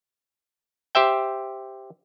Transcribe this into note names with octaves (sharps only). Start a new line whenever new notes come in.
G4 C5 E5 G5